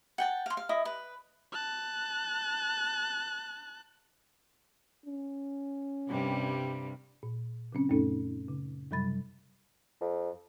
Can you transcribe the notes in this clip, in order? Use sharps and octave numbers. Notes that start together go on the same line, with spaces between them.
F#5 G5 A5
F5 C6
F5
E4 D#5 D#6
B4
A5 F#6
C#4
G2 C3 G3
A#2
C#3 F#3 C4 C#4
F#2 A#2 A3 C#4 D#4 A4
C#3
F#2 C3 F#3 G3 B5 A6
F2